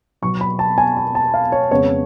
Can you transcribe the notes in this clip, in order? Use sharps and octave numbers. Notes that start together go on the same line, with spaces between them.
B2 F#3 B3 C#6
B5
A5
G#5
A5
A5
F5
C#5
F2 C#3 G#3 B3 C#5